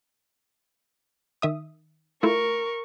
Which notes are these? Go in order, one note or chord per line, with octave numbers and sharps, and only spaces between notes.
D#3 E5 D#6
A3 E4 F4 A#4 C#6